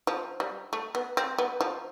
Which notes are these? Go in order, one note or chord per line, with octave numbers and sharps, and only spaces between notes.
F3
G3
A3
B3
C4
B3
F3